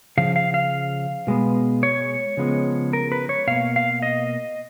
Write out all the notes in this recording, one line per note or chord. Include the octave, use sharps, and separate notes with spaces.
C#3 F3 F5
F5
F5
B2 G#3 B3
C#5
C#3 F3 G#3 B3
A#4
B4
C#5
B2 A#3 F5
F5
D#5